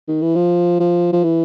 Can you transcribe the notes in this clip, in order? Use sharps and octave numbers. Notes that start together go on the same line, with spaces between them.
D#3
E3
F3
F3
F3
E3